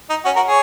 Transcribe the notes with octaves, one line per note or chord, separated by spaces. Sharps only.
D#4
C#4 F#4
F#4 A#4
G#4 C#5